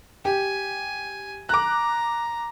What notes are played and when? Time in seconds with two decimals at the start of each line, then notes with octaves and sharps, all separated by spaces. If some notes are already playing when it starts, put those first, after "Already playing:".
0.25 G4 G#5
1.49 A#5 D6 F#6